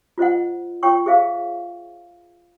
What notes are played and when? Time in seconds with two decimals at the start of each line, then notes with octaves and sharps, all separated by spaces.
0.18 F4 C5 D#5 F#5
0.83 F4 C#5 G5 C#6
1.06 G#4 C5 E5 F5